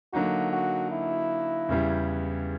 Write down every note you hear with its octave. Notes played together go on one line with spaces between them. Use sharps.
D3 F#3 A#3 D#4 F#4
F#4
E4
E2 C#3 E3 G3